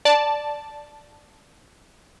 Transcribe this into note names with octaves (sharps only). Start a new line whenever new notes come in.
D5 A5